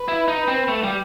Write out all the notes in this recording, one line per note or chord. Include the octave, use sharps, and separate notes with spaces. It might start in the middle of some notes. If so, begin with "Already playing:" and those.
Already playing: B4
E4
D#4
C4
A3
G3